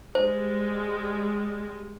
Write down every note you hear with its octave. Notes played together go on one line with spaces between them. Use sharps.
G3 G#3 C5